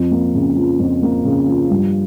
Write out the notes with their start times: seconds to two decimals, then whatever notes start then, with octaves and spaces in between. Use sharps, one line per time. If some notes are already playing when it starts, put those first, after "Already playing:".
Already playing: F2
0.11 A#3
0.35 C#3
0.57 F3
0.79 F2
1.03 A#3
1.25 C#3
1.48 F3
1.70 G2